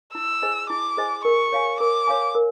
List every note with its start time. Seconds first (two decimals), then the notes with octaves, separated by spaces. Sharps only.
0.15 E4 E6
0.42 G#4 C5 D#5 G#5
0.70 E4 D6
0.97 G#4 C5 D#5 G#5
1.25 A#4 C#6
1.53 C#5 F5 G#5
1.80 A#4 D6
2.07 C#5 F5 G#5
2.35 A#4